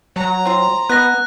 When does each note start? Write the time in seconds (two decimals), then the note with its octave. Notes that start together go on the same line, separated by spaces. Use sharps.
0.16 F#3 A#5
0.45 C4 F4
0.89 B3 B4 D#5 F#6 A#6